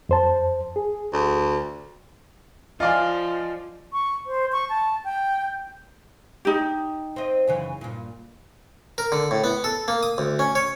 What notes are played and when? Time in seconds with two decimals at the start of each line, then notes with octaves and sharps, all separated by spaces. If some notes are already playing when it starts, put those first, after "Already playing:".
0.09 F2 C5 A5
0.76 G#4
1.13 D2
2.80 F3 F4 D5 D#5 F5 G#5
3.93 C#6
4.27 C5
4.52 C#6
4.69 A5
5.04 G5
6.45 D#4 G4
7.16 C4 D#5
7.48 F#2 C#3 E3
7.81 G2 A#2
8.98 A#4
9.12 D3
9.31 A2
9.44 B3
9.64 A4
9.88 A#3
10.03 D#6
10.18 D2
10.39 C#4
10.55 C#5